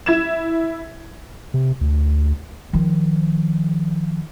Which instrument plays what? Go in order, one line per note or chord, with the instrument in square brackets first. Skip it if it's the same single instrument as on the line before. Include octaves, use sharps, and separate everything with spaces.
[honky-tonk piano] E4 G#6 E7
[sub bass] C3
D2
[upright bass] D#3 F3